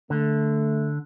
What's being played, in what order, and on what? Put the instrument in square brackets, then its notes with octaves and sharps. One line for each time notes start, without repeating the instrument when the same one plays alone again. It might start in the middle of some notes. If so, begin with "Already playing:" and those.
[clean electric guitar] D3 [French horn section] A3